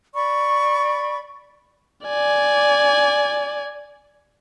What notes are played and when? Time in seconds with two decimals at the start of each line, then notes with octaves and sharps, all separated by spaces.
0.14 D5 B5 C#6
2.06 D5 G#5